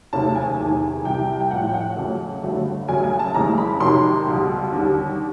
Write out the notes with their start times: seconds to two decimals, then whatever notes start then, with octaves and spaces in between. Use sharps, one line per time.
0.13 F1 D#2 C#3 F#3 A3 A5
0.36 G#5
0.59 E2 C3 D#3
1.05 C2 C3 E3 G5
1.40 G5
1.51 A#1 A2 F3 F#5
1.69 G5
1.74 F#5
1.96 F2 C#3 F#3 A3
2.43 G1 G2 D3 F#3 A3
2.89 F#2 C#3 F#3 A3 G#5
3.04 G#5
3.19 A5
3.34 F#1 F2 C#3 E3 G#3 A#5
3.58 B5
3.80 F2 C3 D#3 F#3 C6
4.27 C#2 B2 G3
4.72 D#2 D3 G3